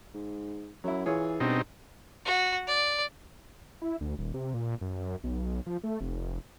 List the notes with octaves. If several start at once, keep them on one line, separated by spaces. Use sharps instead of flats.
G#2
F#2 F#3 E4
E3 F4 G#4 C#5
G2 B2 C4 D#4
F#4
D5
E4
D2
D#1
C3
A#2
F#2
B1
F3
A3
F1